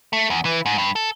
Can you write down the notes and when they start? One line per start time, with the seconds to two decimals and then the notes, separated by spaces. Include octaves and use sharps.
0.13 A3
0.30 E2
0.45 E3
0.66 G#2
0.78 G2
0.96 A4